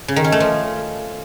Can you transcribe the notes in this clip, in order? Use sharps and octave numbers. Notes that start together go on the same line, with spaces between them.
C#3
D#3
C#4
A3
F3